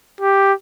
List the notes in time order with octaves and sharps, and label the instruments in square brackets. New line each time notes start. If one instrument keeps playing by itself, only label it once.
[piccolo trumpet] G4